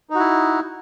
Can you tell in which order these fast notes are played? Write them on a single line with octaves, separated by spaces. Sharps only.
D#4 F#4 E4